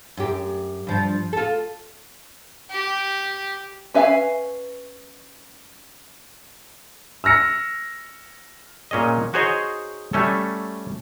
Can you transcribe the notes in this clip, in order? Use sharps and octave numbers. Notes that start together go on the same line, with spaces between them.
F#2 G4
G2 F3
F4 A4
G4
C#4 B4 E5 F5 G#5
E6 F6 A#6 C#7
A#2 C#4 G#4 D#5
D#4 F#4 G#4 C5 C#5 D#5
G3 A3 C#4 A4